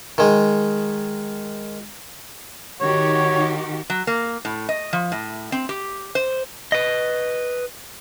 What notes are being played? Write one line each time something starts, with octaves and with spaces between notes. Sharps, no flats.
D#3 G#3
D#3 F#4 G4 C#5
F#3
A#3
A2
D#5
F3
A2
C4
G4
C5
B4 D#5